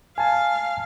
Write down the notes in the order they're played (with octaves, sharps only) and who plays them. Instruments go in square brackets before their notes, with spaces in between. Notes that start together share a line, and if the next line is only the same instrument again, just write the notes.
[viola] F5 [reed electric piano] G#5 A5